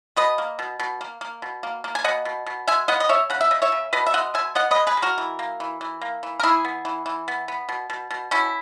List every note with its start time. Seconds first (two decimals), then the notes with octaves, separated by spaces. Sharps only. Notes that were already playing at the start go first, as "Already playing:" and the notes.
0.16 B2 B4 D#5
0.38 A#3
0.59 B2
0.79 B2
1.01 A#3
1.21 A#3
1.42 B2
1.63 A#3
1.84 A#3
1.95 G#5
2.04 B2 D#5 F#5
2.25 B2
2.46 B2
2.67 G#3 E5 G#5
2.88 B3 D#5 F#5
3.00 D#5
3.09 C#3 C#5 E5
3.30 C#3 F#5
3.41 E5
3.51 C#3 D#5
3.62 C#5 E5
3.72 C#3
3.93 B2 B4 D#5
4.06 E5
4.14 G#3 D#5 F#5
4.34 B2 E5 G#5
4.55 B3 D#5 F#5
4.71 B4 D#5
4.76 G#3
4.87 G#4 B4
4.97 G#3
5.02 F#4 A#4
5.18 E3
5.39 A#3
5.60 E3
5.81 E3
6.01 A#3
6.23 E3
6.40 A#4
6.43 E3 E4 G#4
6.65 B3
6.85 E3
7.06 E3
7.28 B3
7.48 B3
7.69 B2
7.90 B2
8.11 B2
8.31 B2 C#4 E4